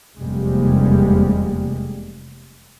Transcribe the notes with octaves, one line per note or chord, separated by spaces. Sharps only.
F1 E2 C3 G3 G#3 A#3